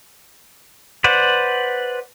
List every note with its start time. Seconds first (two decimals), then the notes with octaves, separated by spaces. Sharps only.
1.04 B4 C5 D5 F#5